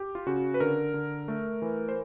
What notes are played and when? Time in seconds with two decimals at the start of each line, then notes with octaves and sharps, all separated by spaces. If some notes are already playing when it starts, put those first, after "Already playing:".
Already playing: G4
0.15 F4
0.27 C#3 F#4
0.54 B4
0.60 D3 A#4
0.94 D3
1.28 A3
1.62 E3
1.89 C5